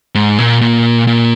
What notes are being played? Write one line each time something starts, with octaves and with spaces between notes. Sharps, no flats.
G#2
A#2
A#2
A#2